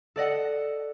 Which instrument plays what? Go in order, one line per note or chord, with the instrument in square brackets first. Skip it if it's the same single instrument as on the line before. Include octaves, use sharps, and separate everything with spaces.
[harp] A4 D5 D#5 F#5